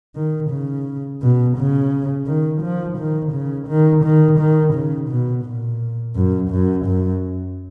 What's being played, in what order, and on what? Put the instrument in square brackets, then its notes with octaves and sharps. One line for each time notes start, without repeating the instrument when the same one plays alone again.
[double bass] D#3
C#3
B2
C#3
D#3
F3
D#3
C#3
D#3
D#3
D#3
C#3
B2
A#2
F#2
F#2
F#2